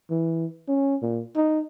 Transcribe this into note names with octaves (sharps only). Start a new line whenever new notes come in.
E3
C#4
A#2
D#4